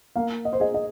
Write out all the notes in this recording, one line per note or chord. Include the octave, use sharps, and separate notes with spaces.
A#3 F5
D#5
C5
G#4 D#5
D#5